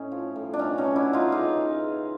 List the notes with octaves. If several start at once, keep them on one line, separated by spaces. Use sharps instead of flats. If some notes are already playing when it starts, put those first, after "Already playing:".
Already playing: A2 C#4 D#4
F3
A2
D4
B2 C#4 D#4
C#4 D#4
F#3
D4 E4
B2
D#4 F4
C#3 D#4 F4
E3
C#3